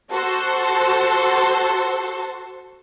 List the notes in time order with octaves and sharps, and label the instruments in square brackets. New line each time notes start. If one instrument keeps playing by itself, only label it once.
[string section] F#4 A4 C5